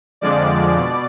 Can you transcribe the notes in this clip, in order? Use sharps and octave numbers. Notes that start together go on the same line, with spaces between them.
F2 D3 F3 G#3 D5
B2